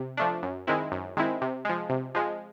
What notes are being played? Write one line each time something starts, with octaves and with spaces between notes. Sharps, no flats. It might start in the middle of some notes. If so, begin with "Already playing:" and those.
Already playing: C3
F3 A3 D4
F#2
D#3 G#3 C4 E4
F#2
D#3 G#3 C4 E4
C3
F3 G#3
C3
F3 G#3